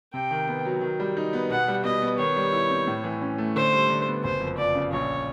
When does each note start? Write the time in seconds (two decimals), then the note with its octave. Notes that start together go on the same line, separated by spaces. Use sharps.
0.14 C3 G5
0.31 D#3
0.48 B3
0.65 F#3
0.81 D#3
1.00 G3
1.17 D#4
1.33 B3
1.50 B2 F#5
1.68 G3
1.84 B2 D#5
2.02 B3
2.18 D#3 C#5
2.36 G3
2.53 E4
2.70 C4
2.87 A2
3.04 E3
3.21 C#4
3.38 A3
3.56 D3 C5
3.73 G3
3.90 D3
4.06 B3
4.24 F#1 C5
4.40 F2
4.58 F3 D5
4.75 C#3
4.92 A#1 C#5